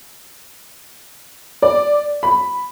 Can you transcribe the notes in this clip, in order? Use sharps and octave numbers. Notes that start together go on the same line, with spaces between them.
D5
B5